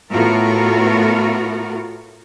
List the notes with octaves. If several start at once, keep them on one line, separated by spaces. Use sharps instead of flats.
A2 A3 B3 F4 F#4 A#4